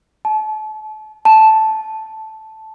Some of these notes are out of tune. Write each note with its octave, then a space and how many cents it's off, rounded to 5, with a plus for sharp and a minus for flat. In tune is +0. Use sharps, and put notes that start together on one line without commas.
A5 -35
A5 -5